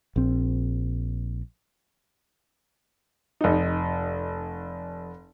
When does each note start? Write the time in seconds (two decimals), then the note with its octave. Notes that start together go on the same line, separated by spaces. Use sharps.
0.16 A#1 C4
3.41 F1 D#4